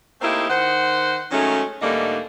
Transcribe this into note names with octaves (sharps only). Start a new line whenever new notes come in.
A3 A#3 C4 D#4 E4 G4
D#3 C5 F#5
D#3 F#3 G#3 A3 C#4
G#2 D3 G3 A3 A#3 D#4